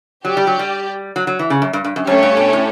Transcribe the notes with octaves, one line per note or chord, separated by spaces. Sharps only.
F#3 G4 D5 G5
G3
F#3
G3
F#3
F#3
E3
C#3
F#2
G2
G2
F#2
F#2 A3 C#4 G4 C#5
G2
B2
A2